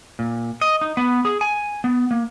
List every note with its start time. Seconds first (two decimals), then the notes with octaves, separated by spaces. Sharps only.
0.19 A#2
0.61 D#5
0.81 D#4
0.97 B3
1.25 G#4
1.41 G#5
1.84 B3
2.11 A#3